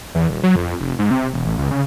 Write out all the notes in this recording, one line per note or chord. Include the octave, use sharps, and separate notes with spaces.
E2
D#1
F#3
F2
F1
G#2
C3
E1
A1
C#2
C#3